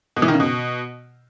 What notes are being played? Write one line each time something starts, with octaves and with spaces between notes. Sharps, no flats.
B2
E3
D#3
C#3
B2